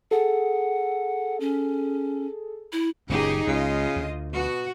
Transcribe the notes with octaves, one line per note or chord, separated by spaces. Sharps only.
G#4 A4 F#5
C#4
E4
F#1 C#2 A#2 C#3 D#4 G4 G#4
C#2 C#3 F4 D#5
D2
B2 F#4